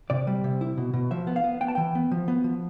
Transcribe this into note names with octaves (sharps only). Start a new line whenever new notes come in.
C3 D5
G3
C3
E4
B2
B2
F3 E5
B3
F5
B3
B3 G5
A5
E3 G5
B3
F3
B3
F3